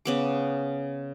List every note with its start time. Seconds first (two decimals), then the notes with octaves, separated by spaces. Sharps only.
0.05 C#3 B3 D6